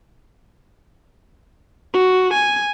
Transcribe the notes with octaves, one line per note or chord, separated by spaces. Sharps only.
F#4
G#5